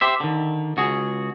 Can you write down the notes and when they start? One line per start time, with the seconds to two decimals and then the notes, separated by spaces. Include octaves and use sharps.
0.01 G4 C5 E5
0.20 D3 D#3
0.77 C#2 F#4 G#4